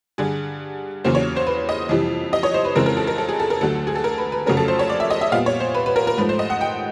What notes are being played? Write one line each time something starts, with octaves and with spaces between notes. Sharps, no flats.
G2 D3 G3 G#4
E2 C#3 F#3 A#3 C#4 C5
C#5
C5
B4
D#5
F2 C3 E3 G3
D#5
C#5
C5
B4
F2 C#3 E3 G#3 C4 A#4
A#4
A4
A#4
A4
G#4
A4
A#4
D2 D3 F#3 A3 A4
G#4
A4
A#4
B4
B4
F2 C#3 F#3 A3 C#4 A#4
A4
C5
C#5
D5
E5
D#5
E5
A#2 G3 B3 F5
C#5
C5
B4
B4
A#4
A#4
G#2 F3 A3 B4
C5
D#5
F#5
G5